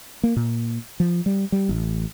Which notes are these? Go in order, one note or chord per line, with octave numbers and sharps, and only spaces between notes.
A#3
A#2
F3
G3
G3
A1